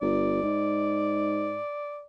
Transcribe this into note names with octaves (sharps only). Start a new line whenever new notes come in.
G1 D5
G#2